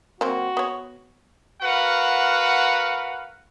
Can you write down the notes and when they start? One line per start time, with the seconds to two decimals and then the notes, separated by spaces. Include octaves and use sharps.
0.21 F#3 A#3 C4 F#4
0.57 B3 C#5
1.62 F#4 A#4 B4 F5 F#5